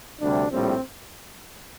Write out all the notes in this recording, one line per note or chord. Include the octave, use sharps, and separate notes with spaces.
D2 C3 G3 D4
A#1 A2 G3 C4